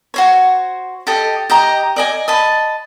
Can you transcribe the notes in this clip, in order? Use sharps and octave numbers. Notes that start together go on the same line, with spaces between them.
F#4 C5 C#5
G4 A4 D#5
G4 D#5 A#5
D5 D#5 G#5
D#5 A5 B5